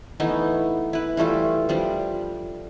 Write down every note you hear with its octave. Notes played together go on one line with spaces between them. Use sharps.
E3 A3 B3 D#4
E4 B4
E3 G3 A3 F4
F3 G3 D4